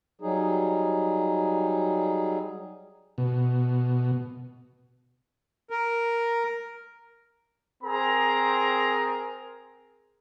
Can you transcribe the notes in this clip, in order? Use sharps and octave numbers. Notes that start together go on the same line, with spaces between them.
F#3 G3 D#4 G#4
B2
A#4
C4 G#4 A#4 A#5